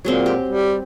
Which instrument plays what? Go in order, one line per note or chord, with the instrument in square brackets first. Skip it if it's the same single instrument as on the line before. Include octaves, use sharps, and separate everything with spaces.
[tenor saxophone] A#2 [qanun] F#3 G#3 C4
[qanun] G4
[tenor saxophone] G3